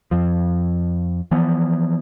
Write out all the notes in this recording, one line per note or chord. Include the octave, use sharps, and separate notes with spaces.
F2 F3
E3 F3 B3